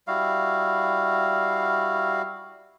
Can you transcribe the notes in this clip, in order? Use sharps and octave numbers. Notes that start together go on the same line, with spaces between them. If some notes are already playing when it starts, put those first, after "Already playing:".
G3 E4 F#4 F5